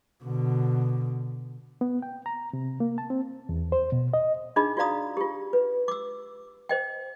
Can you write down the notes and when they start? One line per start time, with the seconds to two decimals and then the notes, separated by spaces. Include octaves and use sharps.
0.24 B2 D3
1.81 B3
2.02 G5
2.26 A#5
2.53 C3
2.80 A#3
2.98 A5
3.10 C4
3.49 E2
3.72 C5
3.92 B2
4.14 D#5
4.56 D4 D#4 F4 G#4 D#5 B5
4.77 F4 F#4 D5 F5 A#5 D#6
5.17 F4 G4
5.53 B4
5.88 D6 E6
6.69 C5 D#5 G5